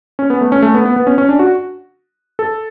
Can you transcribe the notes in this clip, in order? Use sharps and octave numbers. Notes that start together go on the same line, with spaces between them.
C#4
B3
A3
C#4
A3
B3
B3
B3
C#4
C#4
D4
F#4
A4